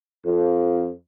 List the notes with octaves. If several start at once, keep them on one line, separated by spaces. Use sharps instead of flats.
F2